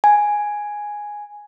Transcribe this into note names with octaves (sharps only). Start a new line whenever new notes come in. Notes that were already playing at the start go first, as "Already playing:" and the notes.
G#5